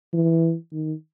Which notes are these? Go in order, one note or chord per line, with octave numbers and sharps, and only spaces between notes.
E3
D#3